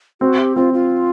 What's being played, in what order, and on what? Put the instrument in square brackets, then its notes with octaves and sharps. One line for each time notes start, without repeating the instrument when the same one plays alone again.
[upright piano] C4 [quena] F#4
[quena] G4
[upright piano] C4 [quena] F4
[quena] F4